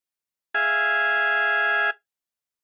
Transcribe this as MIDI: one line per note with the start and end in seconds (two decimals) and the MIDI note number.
0.55 1.90 68
0.55 1.90 76
0.55 1.90 77
0.55 1.90 80